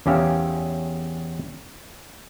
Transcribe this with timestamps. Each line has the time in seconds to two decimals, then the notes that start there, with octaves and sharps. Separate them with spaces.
0.06 E2 C#4 G4 E5 F5